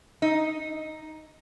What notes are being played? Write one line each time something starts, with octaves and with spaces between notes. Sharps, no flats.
D#4